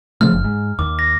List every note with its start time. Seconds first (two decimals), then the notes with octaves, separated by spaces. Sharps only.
0.21 C#3 F3 A3 F6
0.32 F#1
0.44 G#2
0.79 D#2 D6
0.99 A#6